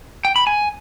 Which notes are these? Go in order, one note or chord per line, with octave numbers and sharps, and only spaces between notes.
G5
B5
G#5